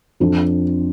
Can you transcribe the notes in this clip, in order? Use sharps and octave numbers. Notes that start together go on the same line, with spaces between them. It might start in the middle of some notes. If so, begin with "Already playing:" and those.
F2 C4 D4